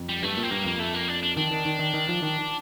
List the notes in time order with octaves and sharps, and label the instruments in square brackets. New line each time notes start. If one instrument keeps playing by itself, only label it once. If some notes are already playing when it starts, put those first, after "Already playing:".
Already playing: [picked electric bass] F2
[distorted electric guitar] G3
[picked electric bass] G2 [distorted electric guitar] A3
[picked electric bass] A#2
[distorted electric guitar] C4
[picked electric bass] G2 [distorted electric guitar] A#3
[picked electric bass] F2
[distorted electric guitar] A3
A#3
D4
D4
[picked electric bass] D#3 [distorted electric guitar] D4
[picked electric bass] D#3
D#3
D#3
D#3
F3
D#3